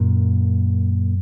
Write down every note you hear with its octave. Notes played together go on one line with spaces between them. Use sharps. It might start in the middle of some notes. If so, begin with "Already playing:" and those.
Already playing: F#2 A#2